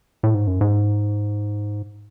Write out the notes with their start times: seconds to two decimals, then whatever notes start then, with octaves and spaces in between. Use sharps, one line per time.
0.23 A2
0.35 G#2
0.47 F#2
0.61 G#2